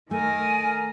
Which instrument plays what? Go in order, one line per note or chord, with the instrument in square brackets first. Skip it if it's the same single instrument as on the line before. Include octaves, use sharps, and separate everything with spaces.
[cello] D#3 A#4 [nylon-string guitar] A3 [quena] G#5